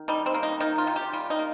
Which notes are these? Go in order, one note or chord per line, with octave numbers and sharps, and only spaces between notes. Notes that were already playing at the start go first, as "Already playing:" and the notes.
Already playing: D#3
G3 D#4
C4
A#3
D#4
D#3 D#4
F4
D#3
G4
G3 F4
D#4
A#3